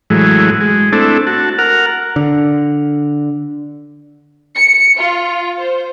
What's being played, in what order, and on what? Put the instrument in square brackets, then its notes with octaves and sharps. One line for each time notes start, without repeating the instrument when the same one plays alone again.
[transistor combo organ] A2 E3 F#3 G#3
G#3
A3 C4 D4 E4 A4
F#4 A5
A#4 F#5 F6
[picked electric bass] D3
[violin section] C#7
F4
C5